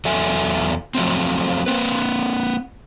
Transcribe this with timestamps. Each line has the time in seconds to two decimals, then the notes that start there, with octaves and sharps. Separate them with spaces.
0.05 E2 F#3 A4 E5 G#5
0.95 F3 F#3 A3 C4
1.66 A#3 C4 B4